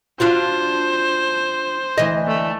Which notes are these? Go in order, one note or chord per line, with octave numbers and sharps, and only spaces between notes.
D4 F4 F#4 C5
D2 E3 D#5
A3